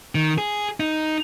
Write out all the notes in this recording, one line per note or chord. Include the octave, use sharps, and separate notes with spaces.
D#3
G#4
D#4